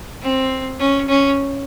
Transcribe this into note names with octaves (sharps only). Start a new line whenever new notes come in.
C4
C#4
C#4